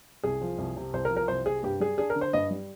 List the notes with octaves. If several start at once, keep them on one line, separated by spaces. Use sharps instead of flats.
C2 G#4
F3
C2
C3
C2 C5
A#4
F3
A#4
C2 C5
C3 G#4
G2 G4
G3 G#4
D4 G#4
A#4
D3
C5
G2 D#5
G3